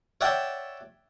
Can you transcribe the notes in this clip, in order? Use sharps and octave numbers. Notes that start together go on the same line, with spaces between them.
C#5 D5 E5 F#5 G5 A5